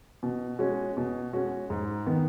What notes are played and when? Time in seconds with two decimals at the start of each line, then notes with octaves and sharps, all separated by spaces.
0.23 B2
0.59 G#3 C#4 F#4
0.97 B2
1.33 G#3 C#4 F#4
1.70 G#2
2.07 D#3 B3